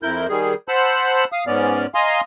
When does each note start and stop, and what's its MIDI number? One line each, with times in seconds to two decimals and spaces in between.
0.03 0.27 41
0.03 0.27 64
0.03 0.27 70
0.03 0.27 91
0.29 0.54 51
0.29 0.54 55
0.29 0.54 68
0.68 1.25 72
0.68 1.25 78
0.68 1.25 81
0.68 1.25 83
0.68 1.25 88
1.32 1.44 77
1.32 1.44 87
1.47 1.86 44
1.47 1.86 59
1.47 1.86 61
1.47 1.86 74
1.47 1.86 89
1.95 2.21 75
1.95 2.21 77
1.95 2.21 80
1.95 2.21 82
1.95 2.21 84
1.95 2.21 87